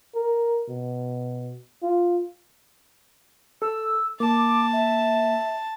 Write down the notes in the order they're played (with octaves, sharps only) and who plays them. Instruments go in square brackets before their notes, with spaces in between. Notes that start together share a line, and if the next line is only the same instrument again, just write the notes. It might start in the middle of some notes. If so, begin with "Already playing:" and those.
[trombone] A#4
B2
F4
[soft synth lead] A4 [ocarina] E6
[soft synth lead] A#3 [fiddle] A5 [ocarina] D6
[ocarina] E5